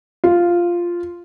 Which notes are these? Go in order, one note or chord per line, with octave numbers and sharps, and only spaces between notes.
F4